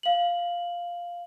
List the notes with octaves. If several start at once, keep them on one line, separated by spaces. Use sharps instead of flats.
F5 F#7